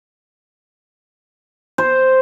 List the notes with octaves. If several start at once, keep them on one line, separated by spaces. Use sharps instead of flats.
C5